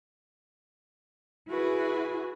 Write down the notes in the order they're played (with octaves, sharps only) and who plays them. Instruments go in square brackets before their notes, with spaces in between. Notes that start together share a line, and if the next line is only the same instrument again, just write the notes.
[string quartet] E4 F#4 G#4 B4